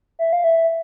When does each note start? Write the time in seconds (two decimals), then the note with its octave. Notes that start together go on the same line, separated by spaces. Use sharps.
0.19 E5
0.33 F5
0.44 E5